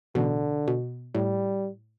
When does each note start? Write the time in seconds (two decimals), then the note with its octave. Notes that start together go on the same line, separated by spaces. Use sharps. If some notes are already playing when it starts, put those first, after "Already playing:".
0.15 A1 B2 D3
0.68 B2
1.15 A2 G3